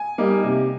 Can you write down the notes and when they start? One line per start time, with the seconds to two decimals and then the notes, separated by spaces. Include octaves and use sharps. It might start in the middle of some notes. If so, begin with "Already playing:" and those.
Already playing: G#5
0.18 G3 A#3 D#4
0.43 C3